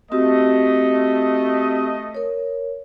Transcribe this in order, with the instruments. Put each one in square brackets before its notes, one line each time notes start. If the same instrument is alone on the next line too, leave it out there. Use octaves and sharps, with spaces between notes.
[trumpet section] A3 D#5 [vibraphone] C4 F#4 G4
[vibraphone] A#4 C#5